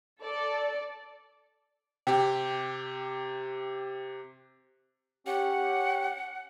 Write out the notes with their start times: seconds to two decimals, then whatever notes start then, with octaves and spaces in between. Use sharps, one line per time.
0.21 A4 D5
2.07 C3 G4 G5
5.27 C#4 G4 F#5